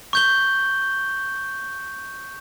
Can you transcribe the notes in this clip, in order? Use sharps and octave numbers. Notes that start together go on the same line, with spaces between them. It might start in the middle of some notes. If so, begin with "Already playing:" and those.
C#6 G6 G7